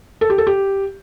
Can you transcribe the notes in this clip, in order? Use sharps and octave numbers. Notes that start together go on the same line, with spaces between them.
A4
G4
A4
G4